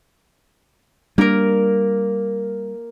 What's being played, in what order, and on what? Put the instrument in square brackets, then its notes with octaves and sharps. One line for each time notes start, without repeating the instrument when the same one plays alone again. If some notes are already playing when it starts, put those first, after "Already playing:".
[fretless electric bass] G3 D4 [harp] A#3 A#4